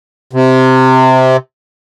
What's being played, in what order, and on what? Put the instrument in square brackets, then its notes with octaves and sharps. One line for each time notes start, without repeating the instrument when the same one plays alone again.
[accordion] C3